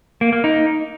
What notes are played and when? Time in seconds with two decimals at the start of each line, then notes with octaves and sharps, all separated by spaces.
0.21 A#3
0.33 A#3
0.44 D#4